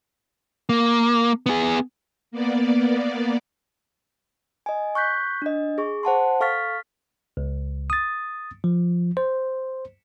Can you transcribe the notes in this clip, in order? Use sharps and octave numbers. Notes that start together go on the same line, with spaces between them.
A#3
B3 G#4
A#3 B3 D5
D#5 G#5
C#6 F#6 G6 B6
D4 D#5
G#4 C#6
C5 F#5 A5 C6
A4 F5 C#6 F6 A6 B6
C#2
D#6 A6
F3
C5